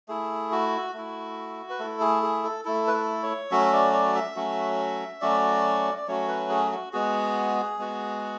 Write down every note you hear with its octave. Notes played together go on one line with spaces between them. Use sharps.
A3 E4 G#4
F#4
A3 E4
B4
A3 E4 A4
G#4
G#4
A4
A3 E4 A4
B4
A4
C#5
F#3 A3 C#4 F#4 E5
D5
D5
E5
F#3 A3 C#4 F#4
F#3 A3 C#4 F#4 D5
D5
F#3 A3 C#4 F#4 C#5
B4
G#4
F#4
G#3 B3 F#4 G#4
G#3 B3 F#4